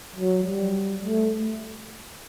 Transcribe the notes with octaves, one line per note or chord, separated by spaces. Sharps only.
F#3
G3
A3